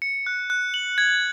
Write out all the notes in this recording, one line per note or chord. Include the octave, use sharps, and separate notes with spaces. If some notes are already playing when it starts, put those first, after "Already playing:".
C#7
F#6
F#6
F#7
G#6